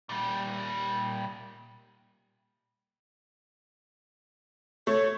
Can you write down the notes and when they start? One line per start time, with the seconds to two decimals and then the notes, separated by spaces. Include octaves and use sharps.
0.09 A#2 G3
4.87 A3 C#5